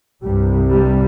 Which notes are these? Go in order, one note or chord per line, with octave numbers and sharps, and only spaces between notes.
C2 G2 C3 G3
G2 G3